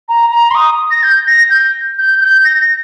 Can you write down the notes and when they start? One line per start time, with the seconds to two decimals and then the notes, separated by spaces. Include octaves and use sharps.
0.09 A#5
0.31 A#5
0.51 C6
0.55 D#6
0.91 A#6
1.03 G6
1.27 A#6
1.50 G6
1.98 G6
2.21 G6
2.45 A#6